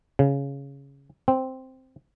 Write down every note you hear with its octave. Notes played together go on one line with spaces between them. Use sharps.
C#3
C4